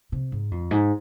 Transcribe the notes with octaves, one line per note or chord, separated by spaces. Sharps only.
C3
G#2
F2
G#2